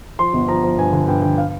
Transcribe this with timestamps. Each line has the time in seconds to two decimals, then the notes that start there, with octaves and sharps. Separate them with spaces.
0.19 F3 C6
0.33 G1
0.48 F3 A#5
0.64 F3
0.78 G2 G#5
0.93 D3
1.08 G2 G5
1.22 D3 G5
1.38 F5